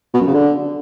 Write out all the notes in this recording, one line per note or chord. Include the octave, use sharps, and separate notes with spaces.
B2
F#2
C#3
D3